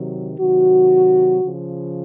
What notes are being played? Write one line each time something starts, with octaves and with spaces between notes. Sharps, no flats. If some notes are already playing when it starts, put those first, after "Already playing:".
Already playing: C3 D#3 F#3
C3 D#3 F#3 F#4
C#3 F3